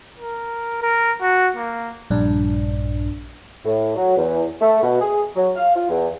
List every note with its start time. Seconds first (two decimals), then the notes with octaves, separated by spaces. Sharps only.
0.18 A#4
0.82 A#4
1.21 F#4
1.56 A#3
2.10 A#1 G2 D4
3.65 A2
3.96 F#3
4.17 E2
4.61 A3
4.83 B2
5.01 G#4
5.36 F#3
5.56 F5
5.75 F4
5.89 E2